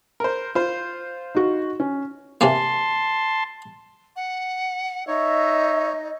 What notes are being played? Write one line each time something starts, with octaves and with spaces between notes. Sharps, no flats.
A#4 C5
F4 C5
D#4 F#4
C#4
C3 E3 A#3 A5 C6
F#5
D#4 C#5 D#5 E5